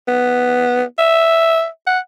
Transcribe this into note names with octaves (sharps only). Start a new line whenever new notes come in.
B3
E5
F#5